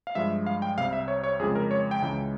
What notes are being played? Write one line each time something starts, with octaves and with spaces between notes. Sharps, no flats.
F5
G2 F3 G#3 E5
F5
G5
C2 C3 G3 F5
E5
C#5
C#5
F2 C#3 F3 G#3 G#4
A#4
C#5
G5
C#2 C#3 E3 G#3